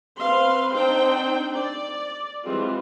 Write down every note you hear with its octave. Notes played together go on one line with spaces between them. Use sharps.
C4 B4 F5 C6
C4 D4 D#4 C5 G5
D5
E3 G3 G#3 C4 F4